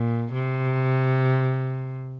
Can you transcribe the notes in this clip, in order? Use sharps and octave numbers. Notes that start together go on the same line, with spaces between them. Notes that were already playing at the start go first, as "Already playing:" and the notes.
Already playing: A#2
C3